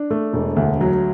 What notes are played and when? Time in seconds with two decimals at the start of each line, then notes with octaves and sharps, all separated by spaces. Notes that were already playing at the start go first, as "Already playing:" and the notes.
Already playing: D4
0.10 A3
0.33 E1
0.56 D2
0.81 F#3